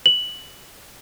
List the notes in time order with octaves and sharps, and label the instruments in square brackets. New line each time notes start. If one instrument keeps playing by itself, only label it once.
[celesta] F#7